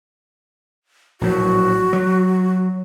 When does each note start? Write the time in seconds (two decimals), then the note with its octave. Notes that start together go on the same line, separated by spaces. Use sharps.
1.21 A#1 A2 F#3 F#4
1.93 F#3